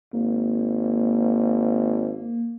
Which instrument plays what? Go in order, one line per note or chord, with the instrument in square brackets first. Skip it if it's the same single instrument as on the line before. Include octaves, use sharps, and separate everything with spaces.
[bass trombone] G#1 [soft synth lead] A#3